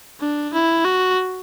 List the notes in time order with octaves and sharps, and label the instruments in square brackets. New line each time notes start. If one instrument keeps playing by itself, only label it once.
[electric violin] D4
E4
F#4